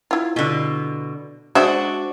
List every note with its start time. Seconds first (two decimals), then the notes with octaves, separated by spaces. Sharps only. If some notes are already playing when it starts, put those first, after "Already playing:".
0.11 E4 F4
0.36 B2 D3
1.55 G#3 D4 F#4 C5 E5